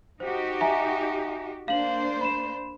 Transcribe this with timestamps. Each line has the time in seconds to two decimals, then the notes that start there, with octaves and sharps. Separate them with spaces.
0.20 D#4 F#4 G4 C5
0.61 E5 G#5 A#5
1.68 A#3 D4 C5 F5 F#7
2.21 B5 E7